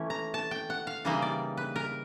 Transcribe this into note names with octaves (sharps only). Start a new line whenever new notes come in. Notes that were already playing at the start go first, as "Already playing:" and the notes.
Already playing: E3 A3 C#4 E4
A#5
A5
G5
F#5
F5
C#3 E3 G3 A#3 D#4
D5
B4
A#4